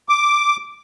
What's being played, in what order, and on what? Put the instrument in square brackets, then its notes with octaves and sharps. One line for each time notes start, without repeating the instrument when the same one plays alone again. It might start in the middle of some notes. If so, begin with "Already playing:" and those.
[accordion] D6